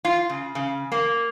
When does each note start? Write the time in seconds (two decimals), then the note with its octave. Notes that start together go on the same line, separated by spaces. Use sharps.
0.05 F4
0.29 C#3
0.55 C#3
0.92 A#3